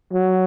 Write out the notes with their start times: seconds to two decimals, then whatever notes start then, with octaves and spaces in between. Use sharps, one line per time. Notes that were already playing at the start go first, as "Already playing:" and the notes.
0.13 F#3